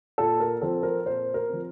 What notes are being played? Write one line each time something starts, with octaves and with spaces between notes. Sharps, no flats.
A#2 A4
A#4
F3 C4 A4
A#4
A#2 C5
A#4
F3 C4